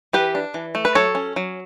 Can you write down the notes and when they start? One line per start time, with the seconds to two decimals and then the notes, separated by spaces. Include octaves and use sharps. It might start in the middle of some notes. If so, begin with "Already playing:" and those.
0.13 E3 G4 B4
0.35 D4
0.54 E3
0.75 A3
0.85 B4
0.95 F#3 A4 C#5
1.15 C#4
1.36 F#3